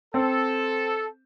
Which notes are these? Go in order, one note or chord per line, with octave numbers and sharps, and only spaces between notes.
C4 A4